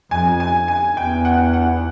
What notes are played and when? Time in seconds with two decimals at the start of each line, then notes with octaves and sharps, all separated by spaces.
0.11 F2 G#5
0.40 G#5
0.68 G#5
0.97 E2 G5
1.25 F#5
1.53 F#5